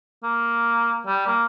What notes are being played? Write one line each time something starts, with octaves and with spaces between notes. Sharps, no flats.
A#3
G3
A#3